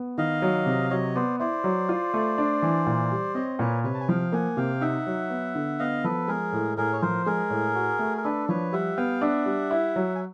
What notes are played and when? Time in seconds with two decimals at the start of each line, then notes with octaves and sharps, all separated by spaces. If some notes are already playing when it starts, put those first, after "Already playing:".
Already playing: B3
0.18 D#3 D#5 F5
0.42 F#3
0.66 C3
0.90 F#3 C#5 D#5
1.15 B3 C5 D5
1.40 E4 C5 D5
1.64 F#3
1.89 F4
2.14 A3
2.38 D4
2.62 E3
2.86 A#2
3.11 G3
3.35 C4 C#5 D#5
3.59 A#2 B4 C#5
3.84 C3 B4 C#5
3.94 A5
4.01 G#5
4.08 F3 F5 G5
4.32 A#3 F#5 G#5
4.57 C3 F5 G5
4.81 D#4 E5 F#5
5.07 F#3
5.30 B3
5.55 D3
5.79 B3 D#5 F5
6.04 F3 A4 B4
6.28 G#3 G#4 A#4
6.52 A2
6.77 A2 G#4 A#4
6.93 C#5
7.02 F3 A#4 C5
7.26 G#3 G#4 A#4
7.50 A2
7.75 F#4
7.99 A3
8.17 A#4
8.24 D4 A4 B4
8.49 F3 B4 C#5
8.73 G3 E5 F#5
8.97 B3 F5 G5
9.22 D4 E5 F#5
9.46 G3
9.71 E4
9.96 F#3
10.15 G#5